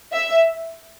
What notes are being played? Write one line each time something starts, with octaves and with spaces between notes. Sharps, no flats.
E5